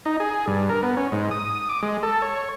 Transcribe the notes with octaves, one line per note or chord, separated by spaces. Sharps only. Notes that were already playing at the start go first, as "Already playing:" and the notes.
D#4
G#4
G2
A#4
B3
C#4
G#2
D#6
D6
G#3
A4
C#5